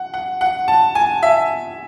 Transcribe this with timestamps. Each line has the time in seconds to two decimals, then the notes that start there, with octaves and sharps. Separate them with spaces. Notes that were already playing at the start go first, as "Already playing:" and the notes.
Already playing: F#5
0.14 F#5
0.41 F#5
0.68 A5
0.95 G#5
1.23 E5